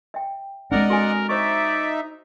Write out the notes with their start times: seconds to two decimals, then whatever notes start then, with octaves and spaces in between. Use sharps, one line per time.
0.14 E5 G5
0.72 G#3 C4 D4 A#4 D5 D#5 F#5
0.90 F#4 A4 A#4 G#5
1.29 D#4 C5 D5 E5 C#6